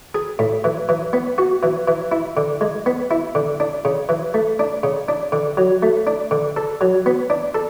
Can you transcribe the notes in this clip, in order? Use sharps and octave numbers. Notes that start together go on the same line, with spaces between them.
G#4
A2
E3
E3
B3
F#4
E3
E3
E4
D3
G#3
B3
E4
D3
D4
C#3
E3
A3
D4
C#3
D4
D3
F#3
A3
D4
D3
A4
F#3
B3
D4
A4